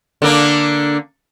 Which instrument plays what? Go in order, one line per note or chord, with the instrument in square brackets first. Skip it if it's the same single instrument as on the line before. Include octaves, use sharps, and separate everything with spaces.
[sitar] D3 A#3 D4